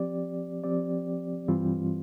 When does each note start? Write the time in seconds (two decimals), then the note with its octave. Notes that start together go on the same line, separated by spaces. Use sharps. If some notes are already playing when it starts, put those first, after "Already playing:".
Already playing: F3 C4 G4 D5
0.64 F3 C4 G4 D5
1.48 G2 E3 G3 C4 F4